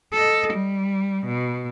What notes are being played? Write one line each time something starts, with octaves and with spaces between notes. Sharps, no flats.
A4 D#5
G3
B2